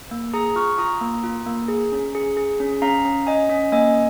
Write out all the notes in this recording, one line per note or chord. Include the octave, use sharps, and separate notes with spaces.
A#3
G#4 A#5 D#6
F4 C#6 F6
F4 A#5 D#6
A#3
F4
A#3
G#4
C#4
G#4
G#4
C#4
C#4 F5 A#5
C#4
C#4 D#5 G#5
C#4
A#3 D#5 G#5